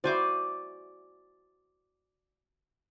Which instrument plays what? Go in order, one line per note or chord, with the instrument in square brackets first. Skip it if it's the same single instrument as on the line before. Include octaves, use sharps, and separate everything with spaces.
[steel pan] E4 F#4 C5 [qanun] D5 G#5 D6